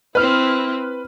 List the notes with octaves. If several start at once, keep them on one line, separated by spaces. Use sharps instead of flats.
C4 E4 B4 F6